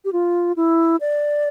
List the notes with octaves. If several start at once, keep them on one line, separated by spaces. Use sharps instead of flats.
G4
F4
E4
D5